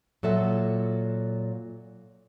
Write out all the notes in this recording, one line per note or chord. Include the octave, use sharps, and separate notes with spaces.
A#2 F#3 A4 E5